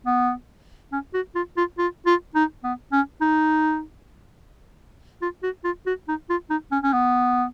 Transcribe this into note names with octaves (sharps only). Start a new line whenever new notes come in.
B3
C#4
F#4
F4
F4
F4
F4
D#4
B3
C#4
D#4
F4
F#4
F4
F#4
D#4
F4
D#4
C#4
C#4
B3